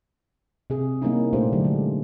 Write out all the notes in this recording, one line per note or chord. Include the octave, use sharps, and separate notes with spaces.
C3 G#4
G3 A#3 C#4 D#4 E4
A#2 G3 A3 D4 G4 C5
D3 F#3 G4
G#3